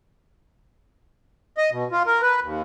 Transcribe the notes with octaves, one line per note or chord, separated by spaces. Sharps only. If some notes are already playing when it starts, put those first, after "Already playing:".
D#5
B2
F4
A#4
B4
D#2